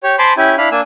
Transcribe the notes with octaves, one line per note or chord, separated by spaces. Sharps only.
G4 C#5
C5 G#5 A5 B5 C6 D6
C#4 E4 G4 G#5
D4 E4 F5 B5
A#3 D4 G#5 E6